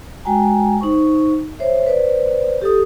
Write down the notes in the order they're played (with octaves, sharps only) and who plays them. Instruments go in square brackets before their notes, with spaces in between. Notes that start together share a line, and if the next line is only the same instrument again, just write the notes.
[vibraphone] G#3 F#4 G5 G#5 A#5
D#4 C5 C#6
C5 C#5 E5
B4 C5 D5
G4 A4 D#6